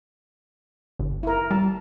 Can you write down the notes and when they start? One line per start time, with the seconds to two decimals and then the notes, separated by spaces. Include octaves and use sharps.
0.99 G1
1.23 E4 A#4
1.51 G3 A5